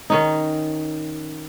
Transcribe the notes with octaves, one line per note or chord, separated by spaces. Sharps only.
D#3 C#4 D#4